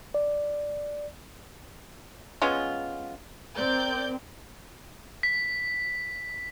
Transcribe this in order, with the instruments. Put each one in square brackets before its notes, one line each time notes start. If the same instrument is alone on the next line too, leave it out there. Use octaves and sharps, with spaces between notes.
[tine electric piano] D5
[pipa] G#3 B3 C#4 F4
[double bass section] C4 [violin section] A#4 D5 G6
[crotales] B6